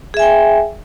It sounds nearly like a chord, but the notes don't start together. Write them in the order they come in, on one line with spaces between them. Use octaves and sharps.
G#4 E5 G#5 G5